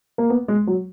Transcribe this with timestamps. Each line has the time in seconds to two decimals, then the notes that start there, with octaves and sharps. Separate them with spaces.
0.18 A#3
0.30 B3
0.48 G#3
0.67 F#3